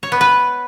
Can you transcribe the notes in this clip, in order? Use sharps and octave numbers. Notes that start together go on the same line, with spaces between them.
C#5
B3
B4